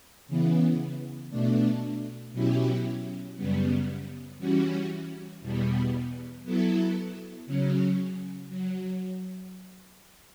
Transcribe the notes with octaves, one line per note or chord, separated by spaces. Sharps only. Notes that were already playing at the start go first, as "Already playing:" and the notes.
C#3 E3 B3
B2 A3 D4
B2 F#3 C#4 E4 G4
F#2 C#3 G3 B3
E3 G3 C#4 F#4
E2 B2 G3 B3
F#3 B3 E4 A4
C#3 F#3 C#4
F#3